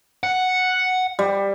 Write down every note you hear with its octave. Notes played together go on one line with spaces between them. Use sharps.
F#5
G3